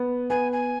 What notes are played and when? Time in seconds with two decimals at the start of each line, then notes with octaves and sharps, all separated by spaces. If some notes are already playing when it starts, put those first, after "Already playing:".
Already playing: B3
0.30 B3 G#5
0.52 G#5